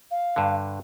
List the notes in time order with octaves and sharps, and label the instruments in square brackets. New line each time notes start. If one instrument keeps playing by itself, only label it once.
[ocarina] F5
[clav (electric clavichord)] G2 D3